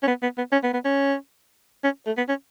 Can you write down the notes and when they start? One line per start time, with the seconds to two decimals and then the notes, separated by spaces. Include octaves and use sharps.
0.03 C#4
0.08 B3
0.23 B3
0.38 B3
0.52 C#4
0.64 B3
0.74 B3
0.85 C#4
1.84 C#4
2.07 A3
2.17 B3
2.29 C#4